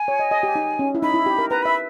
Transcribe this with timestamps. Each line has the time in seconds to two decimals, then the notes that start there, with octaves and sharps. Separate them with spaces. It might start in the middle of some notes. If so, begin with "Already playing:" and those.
Already playing: G#5
0.08 C#5
0.19 D#5
0.31 D#5
0.43 G4
0.55 D#4
0.79 C#4
0.95 E4
1.02 D#4 B5
1.14 E4
1.26 G4
1.39 A#4
1.50 B4 A#5
1.63 E5 B5